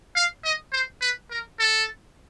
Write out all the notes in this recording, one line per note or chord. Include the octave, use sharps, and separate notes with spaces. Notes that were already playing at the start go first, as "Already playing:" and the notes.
F5
D#5
C5
B4
A#4
A4